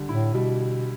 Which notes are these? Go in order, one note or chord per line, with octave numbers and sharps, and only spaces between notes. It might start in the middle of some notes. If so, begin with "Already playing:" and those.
Already playing: D3 G3
A2 E4
B2 G3